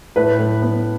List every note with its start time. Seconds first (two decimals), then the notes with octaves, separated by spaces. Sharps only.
0.16 A2 B4
0.39 A2
0.62 B3